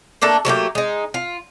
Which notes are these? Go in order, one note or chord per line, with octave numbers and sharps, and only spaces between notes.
A3 A#3 D4 A4
F#3 A3 A#3 G4
G#3 D#4
F4